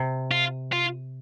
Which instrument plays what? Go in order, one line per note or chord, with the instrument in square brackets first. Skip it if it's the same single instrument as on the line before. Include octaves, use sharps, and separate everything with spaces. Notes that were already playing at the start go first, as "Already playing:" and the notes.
Already playing: [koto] C3
[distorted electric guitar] F4
F4